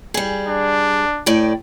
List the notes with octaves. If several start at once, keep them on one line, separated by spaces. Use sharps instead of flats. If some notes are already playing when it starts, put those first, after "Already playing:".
G3 G#4
D4
A2 D5 G5